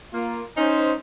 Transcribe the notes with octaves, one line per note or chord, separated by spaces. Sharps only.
A#3 F4
C#4 D#4 C5